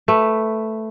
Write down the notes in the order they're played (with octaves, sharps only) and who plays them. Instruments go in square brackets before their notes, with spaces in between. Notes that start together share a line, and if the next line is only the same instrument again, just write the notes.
[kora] A3 B4